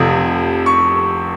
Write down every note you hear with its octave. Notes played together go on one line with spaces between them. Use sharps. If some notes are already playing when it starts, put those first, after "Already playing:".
Already playing: F1 F2 C3 F3 D#6
C#6